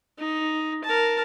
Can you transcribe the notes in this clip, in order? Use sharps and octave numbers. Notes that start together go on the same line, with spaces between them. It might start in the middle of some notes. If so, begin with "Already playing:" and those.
D#4
A#4 A5